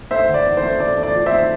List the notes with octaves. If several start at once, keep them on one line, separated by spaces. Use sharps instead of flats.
A3 C5 E5
D3
D5
E2
C5
A3
A3 D5
A3
D5
F3
C5 E5
A3